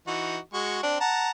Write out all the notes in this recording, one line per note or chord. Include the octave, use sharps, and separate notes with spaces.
E3 D#4 F#4
G#3 F#4 C#6
C4 D4
F#5 A5 A#5